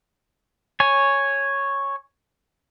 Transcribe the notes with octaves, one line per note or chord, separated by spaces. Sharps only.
C#5 G#5